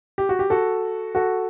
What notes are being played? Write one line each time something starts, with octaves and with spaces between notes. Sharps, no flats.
G4
F#4
G4
F#4 A4
F#4 A4